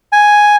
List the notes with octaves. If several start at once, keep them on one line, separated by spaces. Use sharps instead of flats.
G#5